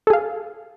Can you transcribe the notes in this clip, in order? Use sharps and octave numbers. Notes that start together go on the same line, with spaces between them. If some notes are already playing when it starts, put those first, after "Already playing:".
G#4 A4 F5